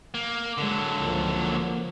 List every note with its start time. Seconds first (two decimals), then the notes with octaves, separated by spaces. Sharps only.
0.14 A#3
0.58 D3 F#3 G#3
0.96 C#2 F3 A#3